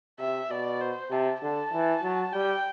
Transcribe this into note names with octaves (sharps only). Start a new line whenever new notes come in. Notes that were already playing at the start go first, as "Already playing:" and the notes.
C3 E5
B2 D5
C5
C3 A5
D3 A5
E3
F#3
G3 G5